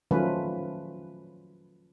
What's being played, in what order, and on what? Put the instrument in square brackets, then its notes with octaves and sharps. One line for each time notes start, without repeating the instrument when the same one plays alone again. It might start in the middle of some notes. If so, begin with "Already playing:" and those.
[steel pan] D#3 F3 F#3 A3 C#4 B4